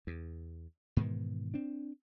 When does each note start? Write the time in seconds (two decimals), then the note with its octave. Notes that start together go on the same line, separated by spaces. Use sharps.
0.07 E2
0.97 G#2 B2 D#3 E3
1.54 C4 D4